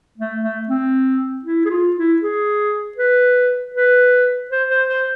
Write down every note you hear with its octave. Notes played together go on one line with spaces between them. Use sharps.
A3
A3
C4
E4
G#4
F4
E4
G#4
B4
B4
C5
C5
C5